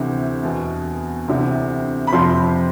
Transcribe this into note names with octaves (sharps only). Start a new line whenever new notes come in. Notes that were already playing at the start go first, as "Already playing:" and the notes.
Already playing: D2 C3 E3
E2 B2
D2 C3 E3
B5
F2 C3 F3 C6